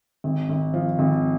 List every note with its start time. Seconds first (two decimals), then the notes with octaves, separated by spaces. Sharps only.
0.24 G#1
0.49 G#1
0.74 F3
0.99 G#1